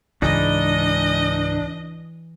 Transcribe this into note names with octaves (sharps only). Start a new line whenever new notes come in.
C#2 G#2 E3 D4 D#4 D#5